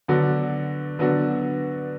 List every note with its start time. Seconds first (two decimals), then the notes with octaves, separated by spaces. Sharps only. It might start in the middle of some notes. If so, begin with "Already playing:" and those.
0.08 D3 F#3 B3 D4 F#4
0.99 D3 F#3 B3 D4 F#4